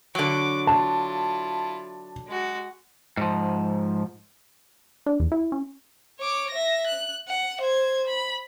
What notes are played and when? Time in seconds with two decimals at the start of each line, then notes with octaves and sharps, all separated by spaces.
0.15 D3 F#3 D6
0.67 E4 F4 A5
2.27 G#3 F#4
3.17 G#2 F3
5.06 D4
5.20 E2
5.32 E4
5.52 C#4
6.20 C#5 D6
6.50 E5 A#6
6.87 F#6
7.28 F#5
7.61 C5 G#6
8.07 B5